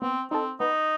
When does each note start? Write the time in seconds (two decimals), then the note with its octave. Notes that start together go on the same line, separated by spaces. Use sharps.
0.02 B3 C4
0.31 C4 D#4 A4
0.60 B3 D#4